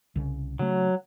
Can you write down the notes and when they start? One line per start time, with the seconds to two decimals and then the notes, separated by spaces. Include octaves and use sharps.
0.16 C2 C#3
0.59 C#3 F#3 A3